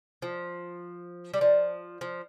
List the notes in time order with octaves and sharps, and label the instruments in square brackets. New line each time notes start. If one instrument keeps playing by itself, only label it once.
[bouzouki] F3
G3
F3
F3